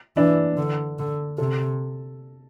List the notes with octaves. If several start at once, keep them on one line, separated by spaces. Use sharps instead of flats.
E3 D4
D3
D3
C3 A4